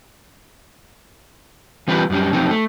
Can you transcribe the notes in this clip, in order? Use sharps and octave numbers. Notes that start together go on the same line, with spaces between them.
E3 G3 C4 F4 G4 B4
F#2 G3 C#4
F2 F3 F#3 C4 D#4
A3